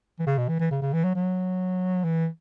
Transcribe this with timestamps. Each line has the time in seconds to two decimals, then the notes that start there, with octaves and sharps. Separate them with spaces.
0.20 E3
0.26 C#3
0.38 B2
0.49 E3
0.60 E3
0.71 C#3
0.82 C#3
0.93 E3
1.04 F#3
1.15 F#3
2.04 E3